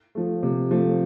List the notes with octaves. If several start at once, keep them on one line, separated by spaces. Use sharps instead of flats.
F3 A3
C3
F3 A3